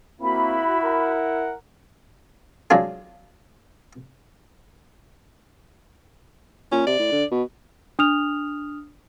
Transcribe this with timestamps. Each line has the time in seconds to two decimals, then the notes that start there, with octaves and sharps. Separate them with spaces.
0.21 A#3 C4 E4 F#4 B5
0.83 A#4 F#5
2.70 F#3 G#3 D4 F4 G#4
6.72 A#2 C#4
6.87 C3 D5
6.99 A2
7.12 D3
7.31 B2
7.99 D4 D#6 F6 F7